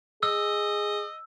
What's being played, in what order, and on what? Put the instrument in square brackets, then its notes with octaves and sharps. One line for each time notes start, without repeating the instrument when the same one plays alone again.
[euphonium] G#4 [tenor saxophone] D#5 [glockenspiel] E6